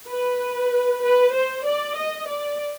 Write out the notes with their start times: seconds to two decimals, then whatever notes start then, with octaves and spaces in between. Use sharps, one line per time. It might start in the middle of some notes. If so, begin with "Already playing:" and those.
0.08 B4
1.03 B4
1.33 C5
1.64 D5
1.96 D#5
2.28 D5